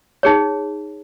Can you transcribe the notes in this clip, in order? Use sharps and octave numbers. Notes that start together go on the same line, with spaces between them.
D#4 G#4 C#5